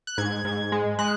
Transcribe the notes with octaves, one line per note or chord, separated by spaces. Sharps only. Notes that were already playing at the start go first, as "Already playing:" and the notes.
F#6
G#2 G#6
G#2
G#3
G#3 F#6